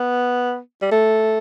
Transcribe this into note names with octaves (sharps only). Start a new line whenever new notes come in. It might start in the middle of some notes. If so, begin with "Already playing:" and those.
Already playing: B3
G3
A3